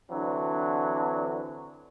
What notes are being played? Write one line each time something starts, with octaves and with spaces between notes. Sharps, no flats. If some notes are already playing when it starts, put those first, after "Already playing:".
D3 E3 F#3 C4 D4